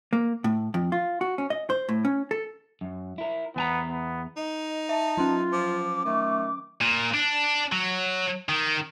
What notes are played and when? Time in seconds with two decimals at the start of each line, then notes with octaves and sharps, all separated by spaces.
0.13 A#3
0.44 A2
0.74 F2
0.92 F4
1.21 F#4
1.38 C#4
1.50 D#5
1.70 C5
1.89 A2
2.05 C#4
2.31 A4
2.81 F#2
3.18 E4 A#4
3.56 E2 B3 G#5 A#5
3.90 B3
4.37 D#4 D#5
4.89 E5 A5
5.17 F#3 C#4 F4
5.52 F3 D6
6.05 D#3 A3
6.81 A#2
7.14 D4
7.72 F#3
8.49 D#3